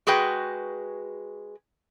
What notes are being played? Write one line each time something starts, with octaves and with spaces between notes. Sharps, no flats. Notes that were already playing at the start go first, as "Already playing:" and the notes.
G#3 F#4 G#4 B4 G5